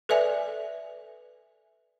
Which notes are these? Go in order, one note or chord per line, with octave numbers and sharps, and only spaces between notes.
A4 B4 D5 E5 G#5